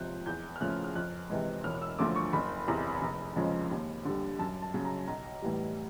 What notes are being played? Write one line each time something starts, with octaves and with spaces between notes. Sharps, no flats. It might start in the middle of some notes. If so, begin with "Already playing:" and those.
Already playing: C#2 C3 F3 F#6 G6
E2 G6
F6
C#3 F3 A3 F#6
F6
F2 F#6
C3 E3 G#3
E1 F6
F6
E6
D2 D3 F3 A3 D6
C#6
F#1 B5
E2 C3 A#5
F1
F2 C#3 F3 G#3
D#2
D3 G3
F#2 A5
A5
C#3 F#3
A#5
B1 A#5
A2 E3 G3